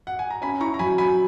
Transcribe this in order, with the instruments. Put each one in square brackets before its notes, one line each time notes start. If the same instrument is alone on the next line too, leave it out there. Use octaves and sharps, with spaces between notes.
[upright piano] F#5
G#5
A#5
[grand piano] C#4 [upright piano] G#5 B5
[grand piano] E4 [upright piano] A#5 C#6
[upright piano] A#5
[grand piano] F#3 [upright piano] G#5 B5
[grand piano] F#3 [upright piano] G#5 B5